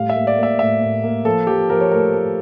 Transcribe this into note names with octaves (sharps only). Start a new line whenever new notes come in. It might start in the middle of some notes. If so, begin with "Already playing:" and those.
Already playing: A2 G3 F5
E5
A#3
D5
A#3
E5
A2 E5
A2
A#3
F3 A4
F3 G4
F3 A#4
C#5
A3 A#4
A3